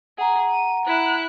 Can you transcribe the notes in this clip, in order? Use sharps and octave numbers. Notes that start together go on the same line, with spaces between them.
G#4 F#5 A#5
D#7
E4 F#6